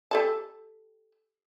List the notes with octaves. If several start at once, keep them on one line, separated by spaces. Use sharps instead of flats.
G4 A4 A5